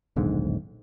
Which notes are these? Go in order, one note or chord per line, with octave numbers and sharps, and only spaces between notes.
D#1 B1 G#2 D3